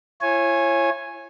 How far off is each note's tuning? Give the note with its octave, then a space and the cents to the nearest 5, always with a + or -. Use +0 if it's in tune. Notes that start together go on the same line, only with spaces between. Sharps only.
E4 +45 C#5 -25 G#5 +0